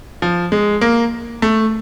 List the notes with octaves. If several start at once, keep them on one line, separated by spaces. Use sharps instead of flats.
F3
G#3
A#3
A3